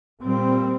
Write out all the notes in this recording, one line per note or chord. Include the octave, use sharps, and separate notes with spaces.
A#2 G3 C4